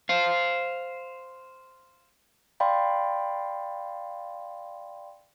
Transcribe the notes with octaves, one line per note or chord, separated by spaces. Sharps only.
C5 F5
D5 F5 G5 B5 C6